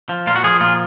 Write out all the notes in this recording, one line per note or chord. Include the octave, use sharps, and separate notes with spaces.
F3
A#2 F4
F#4
F3 G#4
A#2 F4